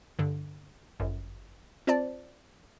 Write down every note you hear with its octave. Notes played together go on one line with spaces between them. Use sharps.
G2 D3
G1 F#2
C4 F4 C5 D5 A5